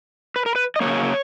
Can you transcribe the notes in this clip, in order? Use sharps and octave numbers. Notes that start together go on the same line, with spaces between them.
B4
A#4
B4
D#5
C#3 F#3 A#3 C#5